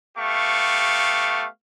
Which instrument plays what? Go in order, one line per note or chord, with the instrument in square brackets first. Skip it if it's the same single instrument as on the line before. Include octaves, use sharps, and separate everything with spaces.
[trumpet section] A3 B3 G4 F5 C#6